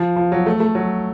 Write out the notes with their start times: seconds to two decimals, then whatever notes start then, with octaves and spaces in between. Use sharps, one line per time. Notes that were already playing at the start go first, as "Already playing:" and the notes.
Already playing: F3
0.16 F3
0.32 F#3
0.46 A3
0.60 A3
0.75 F#3